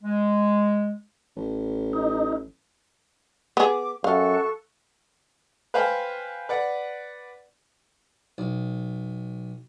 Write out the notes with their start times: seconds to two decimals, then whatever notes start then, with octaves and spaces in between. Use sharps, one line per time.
0.04 G#3
1.36 A1
1.93 D#4
3.57 B3 G#4 D6
4.04 F#2 A4 F5 C#6 F#6
5.74 B4 C5 F5 G5 G#5 B5
6.49 B4 D5 F#5
8.38 B1